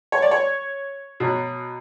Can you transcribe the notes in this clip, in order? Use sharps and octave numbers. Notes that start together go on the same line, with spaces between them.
C#5
D5
C#5
B2 F#3